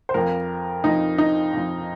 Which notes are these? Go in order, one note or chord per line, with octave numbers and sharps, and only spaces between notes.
C5
F2 F3 A#4
F2 F3 D#4
D#4
F2 F3